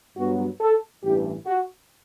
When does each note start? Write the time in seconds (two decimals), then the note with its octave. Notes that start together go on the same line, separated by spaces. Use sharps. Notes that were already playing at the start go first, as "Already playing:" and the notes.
0.16 G2 F#3 B3 F#4
0.61 A4
1.03 A1 G2 E3 G4
1.46 F#4